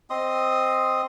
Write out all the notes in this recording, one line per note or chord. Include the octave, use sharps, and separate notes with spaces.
C4 D#5 C6 D#6